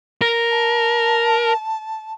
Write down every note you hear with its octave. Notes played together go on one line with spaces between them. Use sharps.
A#4
A5